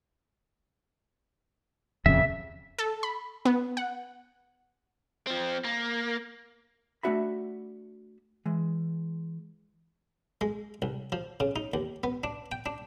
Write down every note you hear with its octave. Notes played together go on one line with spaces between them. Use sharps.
D#1 F2 C#3 E5
A4
B5
B3
F#5
F3 C4
A#3
A3 C#4 D4 F#4 E5 B5
E3 G#3
G#3
C2
F3
C#3
D#4
D#2
B3
D4
G5
D4